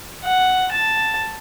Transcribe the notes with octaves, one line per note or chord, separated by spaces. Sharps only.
F#5
A5